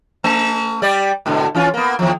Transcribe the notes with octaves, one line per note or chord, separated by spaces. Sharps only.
A3
G3 G4 D5
G#2 B2 D3
E3 C#4 F4
A#3 B3
D#2 F3